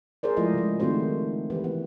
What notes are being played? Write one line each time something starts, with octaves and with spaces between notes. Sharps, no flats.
G#4 A#4 C5 D5
F3 G#3 A3 E4 F4 D#5
C#3 G#3
D#3 A3 C4 F#4 C5
E3 G4 B4
B3